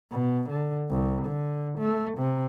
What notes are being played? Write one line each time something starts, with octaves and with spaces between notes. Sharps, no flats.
B2
D3
C2
D3
A3
C3